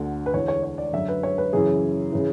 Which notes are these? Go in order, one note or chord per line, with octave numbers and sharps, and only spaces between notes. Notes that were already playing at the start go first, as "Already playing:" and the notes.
Already playing: D2 D3
B4
E2 D3 C#5
C#5
C#5
D5
F#2 D3 E5
B4
C#5
B4
F#2 C#3 E3 G#4
C#3 E3